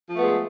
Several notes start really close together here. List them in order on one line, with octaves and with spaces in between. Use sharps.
F3 A3 B3 G#3